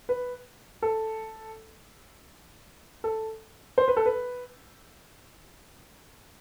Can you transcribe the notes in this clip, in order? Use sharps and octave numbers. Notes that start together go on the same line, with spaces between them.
B4
A4
A4
C5
B4
A4
B4